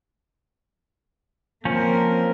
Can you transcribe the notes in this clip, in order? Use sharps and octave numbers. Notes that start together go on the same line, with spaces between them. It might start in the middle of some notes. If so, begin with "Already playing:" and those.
F3 A#3 C4 C#4 A#4